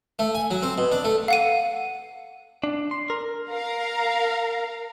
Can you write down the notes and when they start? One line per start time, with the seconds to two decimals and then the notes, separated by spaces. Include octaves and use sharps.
0.19 A3
0.35 G#5
0.51 F#3
0.63 C4
0.78 B2
0.92 D4
1.04 A3
1.28 F5 F#5 D#7
2.64 D4
2.91 C6
3.10 A#4
3.50 A#4 F5 A#5